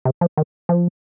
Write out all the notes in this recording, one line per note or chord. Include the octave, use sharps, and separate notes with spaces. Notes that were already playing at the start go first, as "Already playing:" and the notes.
C3
F3
D#3
F3